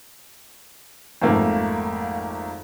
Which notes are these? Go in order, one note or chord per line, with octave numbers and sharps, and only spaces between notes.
G#1 F2 A3 A#3